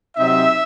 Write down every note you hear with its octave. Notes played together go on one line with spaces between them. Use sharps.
C3 F#3 C4 D#4 E5